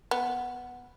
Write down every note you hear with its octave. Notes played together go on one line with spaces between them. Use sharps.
B3